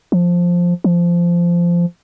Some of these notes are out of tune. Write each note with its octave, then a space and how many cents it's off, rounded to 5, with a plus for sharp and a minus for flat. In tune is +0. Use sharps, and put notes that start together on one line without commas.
F3 +5
F3 -15